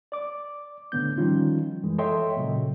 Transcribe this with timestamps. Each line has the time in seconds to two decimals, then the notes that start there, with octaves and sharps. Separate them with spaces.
0.12 D5 D6
0.92 A2 D3 B3 G6
1.18 D#3 F3 G3 C#4 D#4 F4
1.84 F#2 E3 G#3
1.98 A4 C#5 D#5 E5 G5 C6
2.37 A#2 C#3 F#3